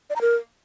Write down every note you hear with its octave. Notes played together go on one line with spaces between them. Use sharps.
D5
A#5
A#4